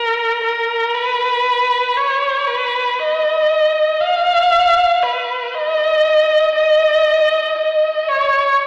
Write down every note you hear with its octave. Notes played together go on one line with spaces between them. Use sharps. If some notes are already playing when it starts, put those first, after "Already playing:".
Already playing: A#4
A#4
B4
C#5
B4
D#5
F5
B4
D#5
D#5
D#5
C#5